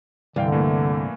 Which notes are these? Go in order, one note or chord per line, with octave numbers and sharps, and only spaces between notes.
C2 G2 D3 E3 F5 G5
E3 A3 A#3